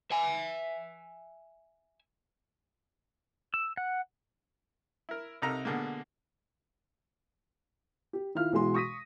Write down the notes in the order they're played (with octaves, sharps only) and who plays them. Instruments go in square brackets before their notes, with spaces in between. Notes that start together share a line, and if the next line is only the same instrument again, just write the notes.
[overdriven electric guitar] E5 G#5
[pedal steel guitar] E6
F#5
[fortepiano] E4 A#4
C2 C3 D#4 A4 A#4 A#5
B2 D3 G#3 A#3
[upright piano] G4
D#3 E4 F4 F6
B1 E3 G#3 F#4 C6
C#6 D#6 A#6 B6 D#7